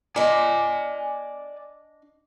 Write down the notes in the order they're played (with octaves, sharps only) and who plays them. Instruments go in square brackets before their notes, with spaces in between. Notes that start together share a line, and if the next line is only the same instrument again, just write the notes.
[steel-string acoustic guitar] D4 D#5 [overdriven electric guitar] D5 G#5